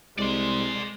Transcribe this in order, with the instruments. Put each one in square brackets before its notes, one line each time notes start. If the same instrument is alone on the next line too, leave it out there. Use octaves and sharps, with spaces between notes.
[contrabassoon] C2 [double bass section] G#3 [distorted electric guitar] D5 C6